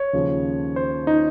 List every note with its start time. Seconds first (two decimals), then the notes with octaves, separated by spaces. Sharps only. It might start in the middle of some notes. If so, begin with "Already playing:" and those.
Already playing: C#5
0.13 D#2 C#3 F3
0.76 C5
1.07 D#4